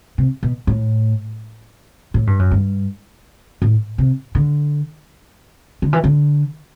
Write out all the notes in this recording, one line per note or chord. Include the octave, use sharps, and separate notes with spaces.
C3
B2
A2
A2
G2
F#2
G2
A2
C3
D3
D3
E3
D3